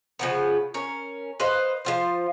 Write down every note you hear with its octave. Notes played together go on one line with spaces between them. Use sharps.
C#3 F3 B3
C#4 A#4
B4 C5 D#5 F5
F3 F4 C5